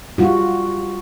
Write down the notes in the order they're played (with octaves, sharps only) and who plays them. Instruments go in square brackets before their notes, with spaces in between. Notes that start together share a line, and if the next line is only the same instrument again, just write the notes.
[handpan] G3 F4 F#4